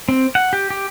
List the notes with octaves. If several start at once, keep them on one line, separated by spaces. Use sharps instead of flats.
C4
F#5
G4
G4